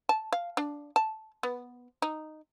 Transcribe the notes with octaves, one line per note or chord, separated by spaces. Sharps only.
A5
F5
D4
A5
B3
D#4